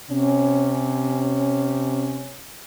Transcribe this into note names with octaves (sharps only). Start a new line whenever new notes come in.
C3 C#4